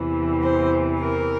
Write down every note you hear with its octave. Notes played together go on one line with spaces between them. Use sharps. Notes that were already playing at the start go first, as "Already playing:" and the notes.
Already playing: E2 C3 E3
C5
A#4